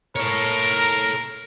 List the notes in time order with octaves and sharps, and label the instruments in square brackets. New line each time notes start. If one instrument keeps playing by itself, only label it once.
[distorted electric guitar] A4 C#5 [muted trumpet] A#4